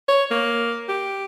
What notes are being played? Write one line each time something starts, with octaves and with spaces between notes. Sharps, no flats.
C#5
A#3
G4